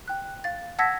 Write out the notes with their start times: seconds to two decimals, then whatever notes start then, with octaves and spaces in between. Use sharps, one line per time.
0.08 G5 F#6
0.44 F5 A6
0.79 F#5 A5 E6 G#6 A#6 B6